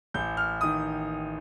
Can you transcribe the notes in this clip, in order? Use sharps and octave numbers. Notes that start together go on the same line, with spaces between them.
A1 G6
F6
D#3 D#6